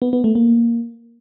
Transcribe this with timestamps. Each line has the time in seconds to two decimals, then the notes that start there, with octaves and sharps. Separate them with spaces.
0.02 B3
0.13 B3
0.24 A3
0.35 A#3